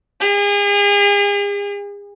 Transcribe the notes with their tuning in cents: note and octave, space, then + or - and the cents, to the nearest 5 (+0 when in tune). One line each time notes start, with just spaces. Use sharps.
G#4 -40